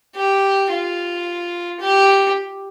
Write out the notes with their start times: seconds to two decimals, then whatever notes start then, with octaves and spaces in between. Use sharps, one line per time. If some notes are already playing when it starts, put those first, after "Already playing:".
0.16 G4
0.71 F4
1.80 G4